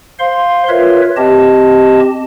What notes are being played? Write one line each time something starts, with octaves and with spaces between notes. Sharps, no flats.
C5 F5 C6
F4 A#4 B4 C#5 E5
C4 G4 D#5 A5